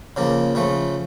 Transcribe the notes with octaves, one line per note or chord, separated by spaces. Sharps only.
C#3 F3 A#3
C#3 F3 A3